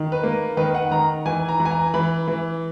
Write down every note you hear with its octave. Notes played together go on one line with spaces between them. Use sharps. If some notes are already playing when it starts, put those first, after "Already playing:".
Already playing: D#3
B4
A#3
D#3 B4
F#5
D#3 A#5
E3 G#5
A#5
E3
G#5
A#5
E3 B5
E3